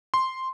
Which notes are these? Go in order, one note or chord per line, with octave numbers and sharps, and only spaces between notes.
C6